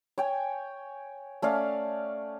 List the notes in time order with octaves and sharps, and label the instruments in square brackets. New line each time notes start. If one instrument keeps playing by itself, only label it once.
[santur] C#5 G5 G#5
A3 C#4 D5 F5